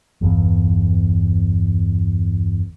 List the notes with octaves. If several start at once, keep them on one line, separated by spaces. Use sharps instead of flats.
G1 E2